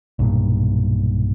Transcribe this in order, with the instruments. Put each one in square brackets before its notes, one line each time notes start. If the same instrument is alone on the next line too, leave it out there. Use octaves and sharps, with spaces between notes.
[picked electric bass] B1 G2 A#2